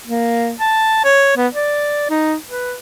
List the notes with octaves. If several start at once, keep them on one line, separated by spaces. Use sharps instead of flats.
A#3
A5
C#5
B3
D5
D#4
B4